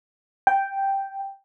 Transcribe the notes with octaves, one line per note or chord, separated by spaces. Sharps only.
G5